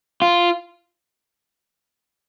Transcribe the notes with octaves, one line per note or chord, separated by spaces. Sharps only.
F4